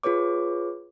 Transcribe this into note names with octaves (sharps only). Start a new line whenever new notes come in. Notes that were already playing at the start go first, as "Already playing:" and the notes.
F4 G#4 B4 C#5 D6